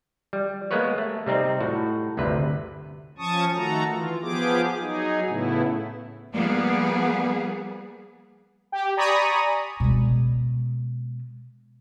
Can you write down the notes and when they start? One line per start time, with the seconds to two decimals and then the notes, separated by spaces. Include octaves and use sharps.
0.33 G3
0.71 G#3 A#3 B3 B4 C#5
0.98 A3
1.26 C3 G3 C4 D#4
1.61 A2 F#4
2.17 G1 D2 C3 B4
3.18 F3 C#4 A5 C#6 D#6
3.55 D#3 A3 F#4 A4 A#5
3.90 E3 F4
4.22 F3 B3 G4 G#4 D6
4.79 F#3 D#4 G#4
5.27 A2 C#3 A3 B3 E4
6.34 F3 G3 A#3 B3 G#4
8.72 G4
8.97 D5 G#5 A#5 B5 C#6 D#6
9.80 B2 G#3